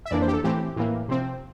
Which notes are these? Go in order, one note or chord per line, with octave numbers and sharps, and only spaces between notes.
E5
F2 E3 A#3 D4 D5
C5
G4
A4
A2 E3 A3 C4 G4
A2 E3 A#3
C3 F3 C4